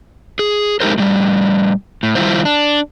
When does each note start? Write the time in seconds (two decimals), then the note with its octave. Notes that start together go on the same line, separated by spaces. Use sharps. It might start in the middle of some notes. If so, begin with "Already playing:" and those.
0.39 G#4
0.80 G#3 D#4 G4 A#4 C5
0.98 A2 G3
2.03 A2
2.15 D#3 G3 E4 F4 C5
2.45 D4